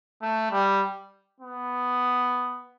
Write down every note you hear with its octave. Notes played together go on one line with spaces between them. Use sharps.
A3
G3
B3